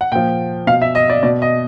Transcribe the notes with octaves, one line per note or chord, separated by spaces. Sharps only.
F#5
A#2 F3 G5
B2 F5
E5
D#5
D5
B2 D5
D#5